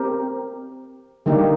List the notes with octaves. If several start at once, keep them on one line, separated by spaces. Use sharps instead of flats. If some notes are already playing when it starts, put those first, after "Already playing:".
Already playing: C4 G4 A#4
D3 G3 A#3 D#4 G4